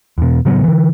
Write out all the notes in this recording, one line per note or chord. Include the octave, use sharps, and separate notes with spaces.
E2 B2
A2 C#3 F#3 B3
D3 E3